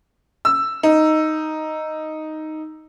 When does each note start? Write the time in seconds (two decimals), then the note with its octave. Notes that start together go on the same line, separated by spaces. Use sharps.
0.45 E6
0.83 D#4